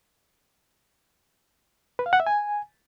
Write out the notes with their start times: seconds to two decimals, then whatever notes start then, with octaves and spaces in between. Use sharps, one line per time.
1.99 B4
2.06 F5
2.13 F#5
2.20 E5
2.27 G#5